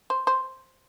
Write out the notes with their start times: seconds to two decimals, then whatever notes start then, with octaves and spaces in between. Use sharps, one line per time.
0.10 C5
0.27 C5